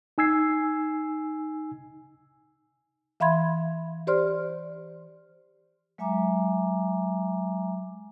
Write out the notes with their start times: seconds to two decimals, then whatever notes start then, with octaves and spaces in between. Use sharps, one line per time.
0.18 D#4 G#5 E6 G#6 C7
3.20 E3 E5 F5 B5 C6 G#6
4.07 G4 C5 D5 C6 F6
5.98 F#3 G#3 E5 G#5 A#5 D6